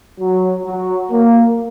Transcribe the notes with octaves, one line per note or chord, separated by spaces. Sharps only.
F#3
F#3
A#3